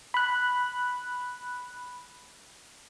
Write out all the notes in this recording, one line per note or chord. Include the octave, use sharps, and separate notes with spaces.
B5 F#6